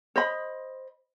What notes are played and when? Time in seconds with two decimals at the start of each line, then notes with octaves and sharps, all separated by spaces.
0.16 C5 D#5 B5